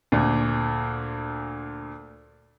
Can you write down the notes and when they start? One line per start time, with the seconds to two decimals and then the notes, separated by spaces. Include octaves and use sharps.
0.12 D2 A#2